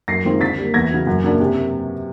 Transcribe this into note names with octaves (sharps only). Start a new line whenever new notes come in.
F#2 A#6 C7
D#3 G#3 C4 F4
D3 A6 B6
G3 A#3
E2 G#6 A#6
C#3 F#3
F#2
C#3 F#3 A#3 D4
C3